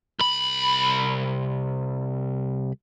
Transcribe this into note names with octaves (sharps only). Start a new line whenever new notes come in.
C2 B5